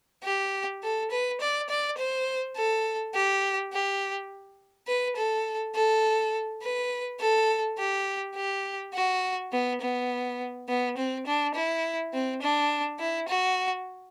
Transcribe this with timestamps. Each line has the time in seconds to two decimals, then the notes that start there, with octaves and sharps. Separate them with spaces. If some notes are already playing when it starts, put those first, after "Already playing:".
0.24 G4
0.83 A4
1.11 B4
1.41 D5
1.69 D5
1.98 C5
2.56 A4
3.15 G4
3.73 G4
4.88 B4
5.17 A4
5.75 A4
6.62 B4
7.20 A4
7.78 G4
8.35 G4
8.94 F#4
9.52 B3
9.81 B3
10.69 B3
10.97 C4
11.26 D4
11.55 E4
12.14 C4
12.42 D4
12.99 E4
13.29 F#4